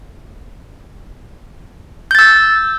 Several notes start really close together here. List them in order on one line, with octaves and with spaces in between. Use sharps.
G6 A6 E6